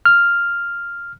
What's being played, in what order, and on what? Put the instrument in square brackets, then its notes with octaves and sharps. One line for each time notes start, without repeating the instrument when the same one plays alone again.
[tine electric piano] F6